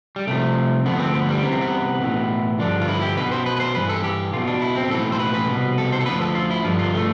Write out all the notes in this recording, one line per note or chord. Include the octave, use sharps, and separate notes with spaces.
G3
C2 C3 F3 A3
D2 D3 F3 B3
C4
B3
G3
C2 C3 E3 B3
C4
B3
B1 A2 E3
G2 D3 F3 D4
F4
E4
G4
B1 B2 B4
C5
B4
B4
C5
G2 E3 B4
A4
G4
B1 B2 F4
D4
E4
C4
B1 A2 E3 A4
C5
B4
B4
C2 B2
A4
C5
A4
D2 D3 F3 B4
A4
F4
E4
G2 D3 F3 F4
F4
A3